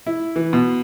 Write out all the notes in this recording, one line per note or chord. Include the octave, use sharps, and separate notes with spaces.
E4
E3
B2